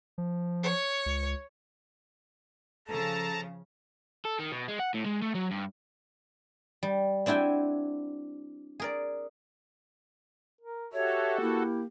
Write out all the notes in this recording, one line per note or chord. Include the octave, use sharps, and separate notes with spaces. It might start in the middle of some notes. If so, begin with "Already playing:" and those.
F3
C#5
C#2
C#3 F3 A4 A5 A#5
A4
D#3
B2
G#3
F#5
A2
G#3
A3
F#3
G2
G3
C4 D4 E4 F#4 G5 G#5
G#4 A#4 D5
A#4
F#4 G4 A4 C#5 E5
A#3 E4